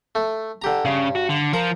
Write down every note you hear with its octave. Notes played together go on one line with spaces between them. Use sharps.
A3
D3 G4 A#5
G2 C#3
F#4
D3
F3 A#4 A#5